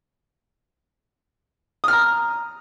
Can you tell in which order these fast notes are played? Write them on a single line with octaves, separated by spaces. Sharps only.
D#6 F6 A#5